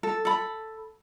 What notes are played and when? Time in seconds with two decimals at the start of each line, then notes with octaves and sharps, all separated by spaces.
0.03 A4
0.25 A4 B5